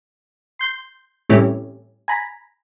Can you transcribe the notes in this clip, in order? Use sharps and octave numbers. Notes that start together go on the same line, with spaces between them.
C6 G6
A2 C3 E3 G3 A3 C#4
G#5 A#5 B5